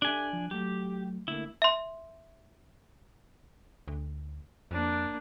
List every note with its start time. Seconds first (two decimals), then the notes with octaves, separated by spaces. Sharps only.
0.02 D4 G4 A4 E5 G#5
0.33 F3
0.51 F#3 A3 G4
1.28 D3 A3 A#3 E4
1.62 E5 C6
3.88 D2
4.71 F2 A#3 D4